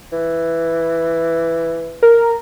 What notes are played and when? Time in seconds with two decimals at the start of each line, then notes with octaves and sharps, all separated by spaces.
0.12 E3
2.03 A#4